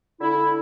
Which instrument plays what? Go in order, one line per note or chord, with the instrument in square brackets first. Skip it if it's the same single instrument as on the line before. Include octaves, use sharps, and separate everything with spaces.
[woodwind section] D3 E4